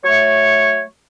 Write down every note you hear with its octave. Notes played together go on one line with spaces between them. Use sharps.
F#3 A3 C#5